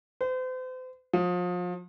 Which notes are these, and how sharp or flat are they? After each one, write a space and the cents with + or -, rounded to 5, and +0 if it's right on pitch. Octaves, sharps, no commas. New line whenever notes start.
C5 -40
F3 +35